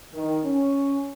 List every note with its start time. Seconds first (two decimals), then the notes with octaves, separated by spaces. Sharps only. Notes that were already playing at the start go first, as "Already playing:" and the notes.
0.13 D#3
0.44 C#4